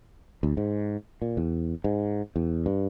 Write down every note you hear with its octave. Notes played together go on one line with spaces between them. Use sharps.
D2
G#2
A#2
E2
G#2
E2
G2